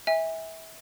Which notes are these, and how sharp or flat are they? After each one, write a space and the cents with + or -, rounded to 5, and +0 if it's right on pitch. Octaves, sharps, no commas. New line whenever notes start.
E5 -25 G#5 -30